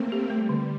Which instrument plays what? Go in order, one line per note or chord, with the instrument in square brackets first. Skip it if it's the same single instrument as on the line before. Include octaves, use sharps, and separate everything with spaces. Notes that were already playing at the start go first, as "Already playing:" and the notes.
Already playing: [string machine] A3 A#3 C4
[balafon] G4
[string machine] G3 [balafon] A3
[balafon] D3